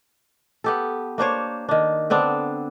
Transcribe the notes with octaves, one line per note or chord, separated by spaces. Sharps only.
B3 G4 A4
A#3 D4 C5 C#5
D#3 D4
D3 B3 C4 D4